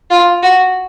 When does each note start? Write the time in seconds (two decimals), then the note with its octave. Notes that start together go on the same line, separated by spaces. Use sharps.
0.11 F4
0.43 F#4